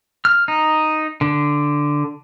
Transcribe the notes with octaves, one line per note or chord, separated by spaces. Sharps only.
F6
D#4
D3